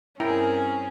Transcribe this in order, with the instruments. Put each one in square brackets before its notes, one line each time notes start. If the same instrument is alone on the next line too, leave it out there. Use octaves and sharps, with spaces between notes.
[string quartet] G2 C4 G#4 [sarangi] C#4 [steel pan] E4 G5 A#5 [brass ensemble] A#4